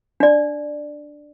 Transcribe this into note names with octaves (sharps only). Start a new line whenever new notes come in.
D4 D5